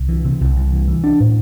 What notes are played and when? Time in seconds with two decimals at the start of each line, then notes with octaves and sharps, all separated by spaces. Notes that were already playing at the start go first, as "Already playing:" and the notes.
Already playing: C2
0.09 E3
0.25 C3
0.41 C2
0.56 C2
0.72 E3
0.88 E3
1.04 D4
1.20 A2